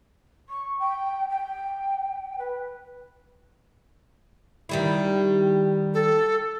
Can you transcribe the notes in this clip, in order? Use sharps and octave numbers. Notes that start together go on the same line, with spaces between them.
C#6
G5
G5
B4
D#3 G3 E4
A4